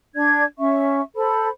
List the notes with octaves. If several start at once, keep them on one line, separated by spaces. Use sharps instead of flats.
D4 D5 G#6
C#4 E5 C#6
A4 C5 B5